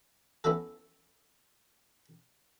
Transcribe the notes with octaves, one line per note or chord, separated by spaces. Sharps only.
B3 C#4 E4 F#4 A4